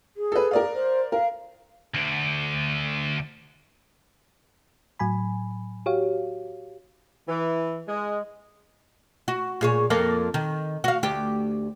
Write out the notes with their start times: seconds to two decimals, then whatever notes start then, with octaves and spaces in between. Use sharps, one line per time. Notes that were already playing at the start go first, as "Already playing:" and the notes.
0.17 G#4
0.32 A4 B4
0.51 A#4 D5 F5
0.75 C5
1.12 A#4 F5
1.95 D2 D3
4.99 A2 F#3 G#5 B5
5.86 F#4 G4 C#5 F5
7.28 E3
7.88 G#3
9.28 F#4
9.61 A#2 G#4 C#5
9.90 F2 A#3 A4
10.34 D#3
10.84 F#4 F5
11.03 D2 G4